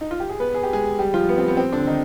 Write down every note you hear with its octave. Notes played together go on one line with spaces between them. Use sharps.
D#4
F4
G4
G#4
B3 B4
G#4
G4
G#3 G#4
G3 G4
F3 F4
B3
C4
B3
C4
D3 D4
D#3 D#4